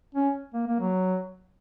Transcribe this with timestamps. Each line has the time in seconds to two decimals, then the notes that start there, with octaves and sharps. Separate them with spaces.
0.15 C#4
0.53 A#3
0.67 A#3
0.79 F#3